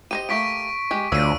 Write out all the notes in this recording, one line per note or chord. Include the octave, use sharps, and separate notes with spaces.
G4 C5 D#5 D#7
A3 A#3 G4 C#6 B6 D7
G#3 G4
D2 F3 D4 C#5 E6 D#7